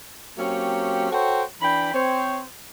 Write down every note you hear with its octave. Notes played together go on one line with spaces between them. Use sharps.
F#3 A#3 C4 C#4 G4
F#4 A4 C5 C#5 G5
E3 D4 G5 B5
C4 C5 C#5